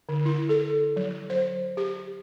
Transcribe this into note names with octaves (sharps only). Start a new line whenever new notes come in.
D3
E4
A4
F#3
C5
G4